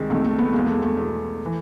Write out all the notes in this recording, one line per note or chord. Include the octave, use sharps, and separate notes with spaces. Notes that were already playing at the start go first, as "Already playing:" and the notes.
Already playing: C2 C3 D#3 G#3
C2 C3 D#3 A3
A3
A3 B3
E2 B2 G#3 A#3
A3
A3
E2 B2
E3